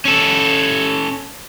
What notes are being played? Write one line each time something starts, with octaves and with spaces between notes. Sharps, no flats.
C#4 A4